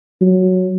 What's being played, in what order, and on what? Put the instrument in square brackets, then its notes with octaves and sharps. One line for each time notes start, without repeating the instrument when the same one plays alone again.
[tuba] F#3